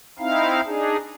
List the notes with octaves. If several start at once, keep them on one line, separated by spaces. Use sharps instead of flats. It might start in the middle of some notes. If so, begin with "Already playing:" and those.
C4 D#4 E4 F5
D4 D#4 G#4